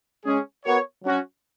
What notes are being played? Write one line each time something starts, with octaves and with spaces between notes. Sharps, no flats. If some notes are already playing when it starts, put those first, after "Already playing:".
G#3 C#4 G#4
B3 F#4 A#4 C#5
F#3 C#4 F#4